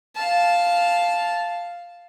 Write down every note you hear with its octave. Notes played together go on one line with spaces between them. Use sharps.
F5 A5